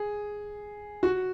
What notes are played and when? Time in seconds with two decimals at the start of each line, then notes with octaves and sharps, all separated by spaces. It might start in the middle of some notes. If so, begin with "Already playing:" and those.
Already playing: G#4
1.03 F#4